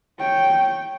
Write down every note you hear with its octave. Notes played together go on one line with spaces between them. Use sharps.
C#5 G5